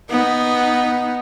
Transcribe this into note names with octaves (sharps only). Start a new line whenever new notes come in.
B3 D#4